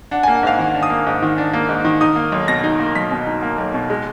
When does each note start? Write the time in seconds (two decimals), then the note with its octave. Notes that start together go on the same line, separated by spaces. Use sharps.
0.11 D4 F#5
0.23 A#3 G#5
0.35 F#5
0.43 G#2 F5
0.59 D#3 F#5
0.75 D4
0.83 D#6
0.90 A#3
1.07 G#2
1.22 D#3
1.38 D4
1.53 A#3
1.69 G#2
1.85 D#3
2.01 D#4 D#6
2.16 A#3
2.32 B1
2.48 B2 A#6
2.64 D#4
2.80 A#3
2.95 B1 B6
3.11 B2
3.27 D#4
3.43 A#3
3.58 B1
3.74 B2
3.90 G#3